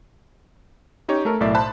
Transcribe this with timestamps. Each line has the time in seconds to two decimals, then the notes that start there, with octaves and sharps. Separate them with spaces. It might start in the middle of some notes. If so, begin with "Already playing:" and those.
1.08 C#4 D#4 G4 C#5
1.25 A3 A4 A#4
1.40 B1 A2 D5 E5
1.55 C5 A5 B5 F#6